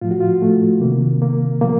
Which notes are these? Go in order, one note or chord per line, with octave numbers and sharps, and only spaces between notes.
A2 F3 F4
F#4
F4
A3
C3 D#3 A#3
A#3
A#2 F3 A#3